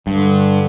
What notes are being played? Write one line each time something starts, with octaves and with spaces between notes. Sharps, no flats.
G2 D3